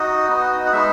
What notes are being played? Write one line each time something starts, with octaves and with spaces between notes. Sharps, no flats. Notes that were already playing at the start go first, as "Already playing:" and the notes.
Already playing: D#4 F#4 D#5
B3 D#4 F#4
F#5
G#3 B3 D#4 E5